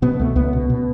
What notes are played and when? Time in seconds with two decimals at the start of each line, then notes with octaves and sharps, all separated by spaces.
0.02 B2 B3
0.19 C#2 A3
0.36 C#2 B3
0.53 B2
0.70 B2